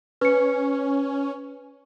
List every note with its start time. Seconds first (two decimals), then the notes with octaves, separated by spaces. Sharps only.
0.21 C#4 B4 C#7